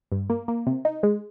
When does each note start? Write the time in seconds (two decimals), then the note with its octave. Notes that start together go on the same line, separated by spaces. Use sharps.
0.12 G2
0.30 A#3
0.48 A#3
0.67 C3
0.85 D#4
1.03 G#3